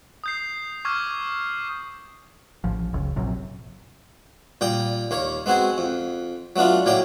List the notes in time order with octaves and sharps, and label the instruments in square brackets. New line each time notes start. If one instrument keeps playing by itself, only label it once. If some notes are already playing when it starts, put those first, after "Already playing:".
[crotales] D#6 G6 C7
C#6 D6 E6 F6 G#6
[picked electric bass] A1 F3
F#1 C#2
A#1 F#2 C3
[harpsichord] A#2 G3 G5 D#6
D#2 A#3 C#5
G#3 B3 C4 F#4 G#4
F2
F#3 A3 B3 D4 F4
A2 F#3 A#3 D5 G5